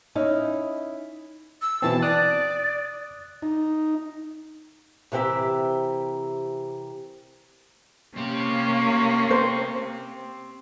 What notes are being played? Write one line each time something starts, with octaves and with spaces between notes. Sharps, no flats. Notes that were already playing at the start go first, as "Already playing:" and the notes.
C#4 D#4 E4 D#5
E6
B2 E3 C4 A5
D5 D6 D#6 F#6
D#4
C3 E3 C4 G4 A#4 E5
A#3 C4 C#4 G4
C5